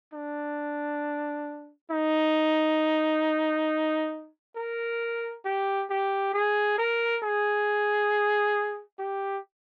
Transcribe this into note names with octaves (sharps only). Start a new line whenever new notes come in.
D4
D#4
A#4
G4
G4
G#4
A#4
G#4
G4